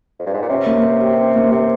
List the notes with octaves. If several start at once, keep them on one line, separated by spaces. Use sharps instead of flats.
F2
G2
G#2
A#2
C3 C#4
A#3
C5
G4
C#4
A#3
C3 C5